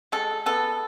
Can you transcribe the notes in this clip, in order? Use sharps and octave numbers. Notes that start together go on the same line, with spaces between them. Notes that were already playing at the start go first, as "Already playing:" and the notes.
G#3 A4
B3 A4